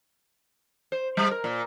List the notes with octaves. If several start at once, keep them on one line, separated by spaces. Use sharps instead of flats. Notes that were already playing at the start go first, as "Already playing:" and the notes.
C5
G3
A#4
A#2